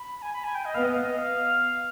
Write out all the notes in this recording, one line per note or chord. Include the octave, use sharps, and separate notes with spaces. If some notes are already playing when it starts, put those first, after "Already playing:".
Already playing: B5
G#5
B5
G#5
G5
D#5
B3 F5
D#5
F5
D#5
F5